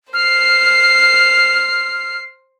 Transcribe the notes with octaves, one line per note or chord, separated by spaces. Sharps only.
C5 F6 C7